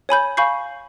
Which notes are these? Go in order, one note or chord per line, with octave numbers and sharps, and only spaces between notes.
C#5 G#5 B5 G6
F5 G#5 B5 C#6 G6 C7